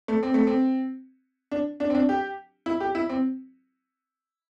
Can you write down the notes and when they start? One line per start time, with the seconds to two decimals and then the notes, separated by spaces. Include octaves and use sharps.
0.08 A3
0.23 C4
0.34 A3
0.47 C4
1.51 D4
1.80 D4
1.90 C4
1.95 D4
2.09 G4
2.66 E4
2.80 G4
2.95 E4
3.09 C4